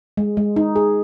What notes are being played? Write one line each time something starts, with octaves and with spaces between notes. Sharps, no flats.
G#3
G#3
D#4
G#4